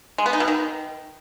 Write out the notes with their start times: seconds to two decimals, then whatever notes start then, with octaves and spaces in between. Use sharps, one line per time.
0.18 G#3
0.26 B3
0.33 D#4
0.40 B2
0.48 D#3